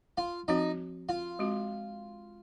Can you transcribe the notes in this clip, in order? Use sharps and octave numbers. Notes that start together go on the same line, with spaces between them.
F4
F3 C4 D#4 F#4
F4
G#3 C4 F#4